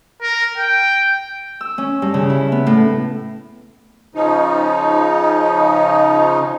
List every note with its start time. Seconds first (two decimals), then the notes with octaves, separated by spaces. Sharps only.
0.22 A#4
0.58 G5
1.61 E6
1.78 C#4
2.02 G2
2.14 C#3
2.30 E4
2.52 B3
2.66 A2
4.15 C#3 F3 D#4